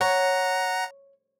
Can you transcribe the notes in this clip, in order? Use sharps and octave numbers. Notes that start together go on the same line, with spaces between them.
C#5 F#5 A#5